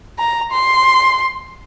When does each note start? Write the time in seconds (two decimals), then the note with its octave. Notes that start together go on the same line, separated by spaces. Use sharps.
0.19 A#5
0.52 C6